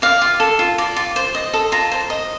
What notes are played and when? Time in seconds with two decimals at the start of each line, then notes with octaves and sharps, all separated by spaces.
0.02 D5 F5
0.22 F4
0.40 A4
0.59 F4
0.78 D5
0.96 F4
1.16 C5
1.35 D#5
1.54 A4
1.72 F4 A#5
1.92 C5
2.10 D#5